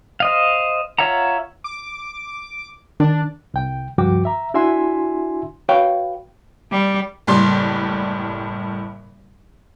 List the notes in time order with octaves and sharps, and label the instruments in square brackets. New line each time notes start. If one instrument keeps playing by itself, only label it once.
[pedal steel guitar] C5 D#5 F5
F4 C#5 E5 F#5 A#5
[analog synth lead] D6
[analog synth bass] D#3 [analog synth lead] D4
[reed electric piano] C2 G5
C#2 G2 F3 F#4 G5 D6
E5 A#5
D4 E4 F#4 E5 G#5 C6
[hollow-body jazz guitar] F#4 B4 C#5 F5 G5
[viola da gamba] G3
[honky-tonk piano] F#1 A2 G3 D5 C6